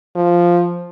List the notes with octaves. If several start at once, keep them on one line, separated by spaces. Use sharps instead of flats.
F3